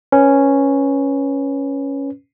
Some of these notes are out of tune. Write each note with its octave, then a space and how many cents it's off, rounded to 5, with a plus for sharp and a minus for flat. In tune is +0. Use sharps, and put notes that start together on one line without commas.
C#4 +0 B4 +0